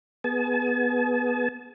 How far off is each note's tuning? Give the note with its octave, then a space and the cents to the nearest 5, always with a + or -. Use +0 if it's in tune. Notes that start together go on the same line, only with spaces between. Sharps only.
B3 -5 G#4 +0 A5 -45